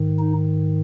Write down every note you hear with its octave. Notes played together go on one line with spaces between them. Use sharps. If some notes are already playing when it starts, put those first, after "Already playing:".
Already playing: G#2 D#3
D#4